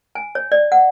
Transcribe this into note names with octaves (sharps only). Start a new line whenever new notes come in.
G#5
C#5
D5
F#5